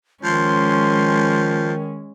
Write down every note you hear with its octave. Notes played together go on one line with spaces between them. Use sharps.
D#3 F3 G#3 C#4 C6